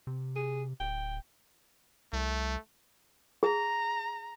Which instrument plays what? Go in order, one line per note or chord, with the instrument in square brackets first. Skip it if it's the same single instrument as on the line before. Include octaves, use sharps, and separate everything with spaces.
[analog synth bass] C3
[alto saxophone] G#4
[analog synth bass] D1 [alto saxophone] G5
[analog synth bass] C2 [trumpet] A3
[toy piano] G#4 [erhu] A#5